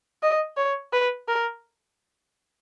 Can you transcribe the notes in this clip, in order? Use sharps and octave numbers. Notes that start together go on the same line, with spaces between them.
D#5
C#5
B4
A#4